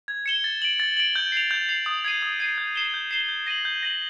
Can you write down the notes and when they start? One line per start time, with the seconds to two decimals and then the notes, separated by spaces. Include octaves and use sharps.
0.08 G#6
0.26 C#7 E7 G7
0.44 A6
0.62 D7 F#7
0.80 A6
0.97 D7 F#7
1.16 G6
1.32 C7 F7
1.51 G6
1.69 C7 F7
1.86 D#6
2.04 G#6 C7 D#7
2.22 D#6
2.40 G#6 C7 D#7
2.58 G6
2.76 C7 E7 G7
2.94 G6
3.11 C7 E7 G7
3.29 G6
3.47 A#6 D#7 F#7
3.65 G6
3.83 A#6 D#7 F#7